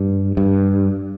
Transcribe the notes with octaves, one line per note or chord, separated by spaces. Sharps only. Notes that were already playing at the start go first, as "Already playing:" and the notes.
Already playing: G2
G2